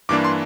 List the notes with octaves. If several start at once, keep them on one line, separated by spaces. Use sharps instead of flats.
G2 E3 A#3 D4 D6
C6